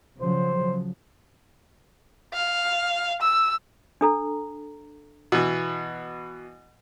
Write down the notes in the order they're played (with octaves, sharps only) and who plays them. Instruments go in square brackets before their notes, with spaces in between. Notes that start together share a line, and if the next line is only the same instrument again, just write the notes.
[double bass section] C#3 F3 F#3 [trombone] C5
[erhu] F5
E6
[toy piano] D4 A4 A#5
[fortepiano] B2 E3